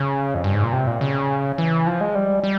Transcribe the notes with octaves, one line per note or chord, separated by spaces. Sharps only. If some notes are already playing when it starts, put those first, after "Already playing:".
Already playing: C#3
F2
G2
G#2
A#2
C3
A#2
C#3
E3
F3
G#3
G3
G3